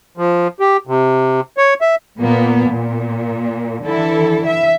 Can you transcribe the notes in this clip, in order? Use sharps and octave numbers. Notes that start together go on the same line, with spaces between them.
F3
G4
C3
C#5
E5
A#2 A#3 B3
A#2
D3 E3 E4 A4
E5